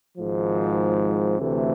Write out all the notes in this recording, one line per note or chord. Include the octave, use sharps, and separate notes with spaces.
G#1 G#2 F3
D2 C3 E3 A3